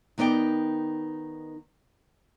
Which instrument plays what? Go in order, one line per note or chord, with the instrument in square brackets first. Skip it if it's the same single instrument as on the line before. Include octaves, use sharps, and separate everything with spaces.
[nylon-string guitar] D#3 B3 D#4 D5 G5